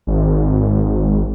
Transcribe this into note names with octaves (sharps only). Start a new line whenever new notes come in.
G#1